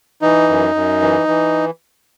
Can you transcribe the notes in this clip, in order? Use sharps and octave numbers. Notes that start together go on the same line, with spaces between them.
E3 D#4
F#2
F#2
E3
E3